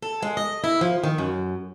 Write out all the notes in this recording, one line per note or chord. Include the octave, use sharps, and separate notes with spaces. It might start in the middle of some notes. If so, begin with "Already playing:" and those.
A4
G#3
D#5
E4
F3
D#3
F#2